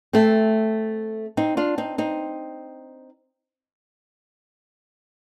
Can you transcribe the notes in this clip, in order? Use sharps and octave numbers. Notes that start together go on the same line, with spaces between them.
A3 C4
C4 D#4
D4 F4
C4 D#4
C4 D#4